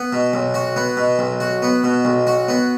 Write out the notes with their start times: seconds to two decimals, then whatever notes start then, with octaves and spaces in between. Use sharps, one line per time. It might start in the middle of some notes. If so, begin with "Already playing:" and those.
Already playing: B3
0.13 B2
0.34 B1
0.54 F#4
0.76 B3
0.97 B2
1.19 B1
1.40 F#4
1.62 B3
1.84 B2
2.05 B1
2.27 F#4
2.49 B3